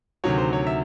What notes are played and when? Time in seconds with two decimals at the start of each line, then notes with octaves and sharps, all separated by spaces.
0.24 D2 C3 D#3 F#3 C#5
0.38 C5
0.53 C#5
0.67 E5